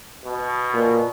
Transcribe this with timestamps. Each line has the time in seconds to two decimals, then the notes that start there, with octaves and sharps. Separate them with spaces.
0.25 B2
0.74 A#2